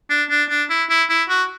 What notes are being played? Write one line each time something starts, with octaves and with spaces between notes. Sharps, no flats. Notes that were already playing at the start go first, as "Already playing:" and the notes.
D4
D4
D4
E4
E4
E4
F#4